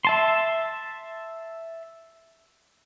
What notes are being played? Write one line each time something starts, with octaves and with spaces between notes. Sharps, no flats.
E5 A5 C6